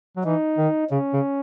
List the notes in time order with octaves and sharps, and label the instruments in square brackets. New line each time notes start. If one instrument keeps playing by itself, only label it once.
[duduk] F#3
[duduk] E3 [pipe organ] D#4
[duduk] D#3
[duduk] C#3 [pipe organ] C#4
[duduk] C#3